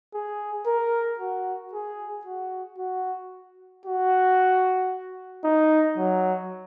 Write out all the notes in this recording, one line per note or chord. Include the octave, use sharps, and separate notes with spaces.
G#4
A#4
F#4
G#4
F#4
F#4
F#4
D#4
F#3